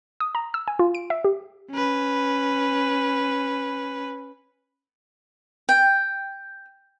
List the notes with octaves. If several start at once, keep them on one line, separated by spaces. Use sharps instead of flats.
D#6
A#5
E6
G#5
F4
D7
E5
G4
C#4 B4
G5